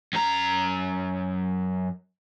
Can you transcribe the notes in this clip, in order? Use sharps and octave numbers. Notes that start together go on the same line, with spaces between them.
F#2 A#5